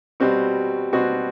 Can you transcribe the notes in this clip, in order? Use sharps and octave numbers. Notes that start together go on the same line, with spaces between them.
B2 G3 C4 F#4
B2 G3 C4 F#4